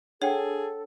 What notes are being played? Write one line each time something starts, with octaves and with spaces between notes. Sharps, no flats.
D4 G#4 A4 C#5 F#5 G5